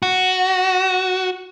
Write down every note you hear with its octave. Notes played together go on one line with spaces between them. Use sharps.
F#4